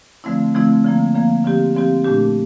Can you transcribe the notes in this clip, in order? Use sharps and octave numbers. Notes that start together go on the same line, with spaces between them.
D3 F3 A3 C4 E4
D3 F3 A3 C4 E4
D3 F3 A#3
D3 F3 A#3
D3 F3 C4 G4
D3 F3 C4 G4
A#2 A3 D4 G4